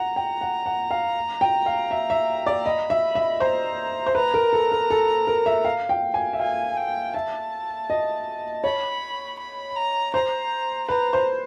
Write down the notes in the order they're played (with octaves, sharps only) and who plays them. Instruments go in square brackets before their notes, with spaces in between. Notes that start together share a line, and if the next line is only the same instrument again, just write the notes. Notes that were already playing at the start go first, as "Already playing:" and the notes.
Already playing: [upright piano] F#5 [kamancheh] A#5
[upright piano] G5
F#5
F#5
F5
G5
F5
E5
E5
D5
[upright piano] D#5 [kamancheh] B5
[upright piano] E5
E5
[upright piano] C5 [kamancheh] A#5
[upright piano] C5
[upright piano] B4 [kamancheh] A#5
[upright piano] A#4
A4
A#4
A4
A#4
E5
F5
G5
G#5
E5
[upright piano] F5 [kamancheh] G#5
[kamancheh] G5
[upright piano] E5 [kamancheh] A5
[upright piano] D#5
[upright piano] C#5 [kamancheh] B5
[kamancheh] B5
A#5
[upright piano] C5 [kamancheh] A#5
[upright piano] B4 [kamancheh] A#5
[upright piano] C5